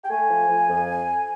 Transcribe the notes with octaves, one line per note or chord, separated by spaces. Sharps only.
G5
A3 G#5
F3
F3
F2